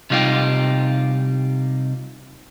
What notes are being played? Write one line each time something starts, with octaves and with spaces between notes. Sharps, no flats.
C3 G3 D#4 F4 G4